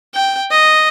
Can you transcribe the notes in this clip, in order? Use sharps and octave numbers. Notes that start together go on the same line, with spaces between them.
G5
D#5